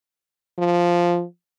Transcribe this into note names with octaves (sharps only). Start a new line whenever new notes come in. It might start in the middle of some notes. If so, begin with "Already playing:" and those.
F3